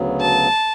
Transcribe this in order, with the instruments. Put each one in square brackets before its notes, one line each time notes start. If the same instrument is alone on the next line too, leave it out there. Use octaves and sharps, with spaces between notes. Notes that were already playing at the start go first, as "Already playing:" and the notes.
Already playing: [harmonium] D2 C#3 F#3 B3
[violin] A5